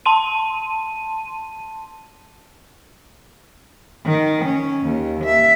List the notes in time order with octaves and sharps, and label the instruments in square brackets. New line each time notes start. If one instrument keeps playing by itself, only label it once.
[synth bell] A5 C6 D#7
[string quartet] D#3
C#4
D#2
E5